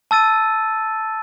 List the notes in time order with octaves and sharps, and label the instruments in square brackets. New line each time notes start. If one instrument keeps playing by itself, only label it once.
[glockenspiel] A5 E6 A6 D#7